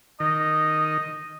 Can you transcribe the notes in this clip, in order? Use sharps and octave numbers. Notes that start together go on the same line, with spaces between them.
D#3 D#5